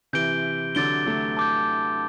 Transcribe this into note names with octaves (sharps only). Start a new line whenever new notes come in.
C3 E3 G6 D7 G7
D3 F#3 D6 A6 D7 G7
F#3 A3
A5 D6 G6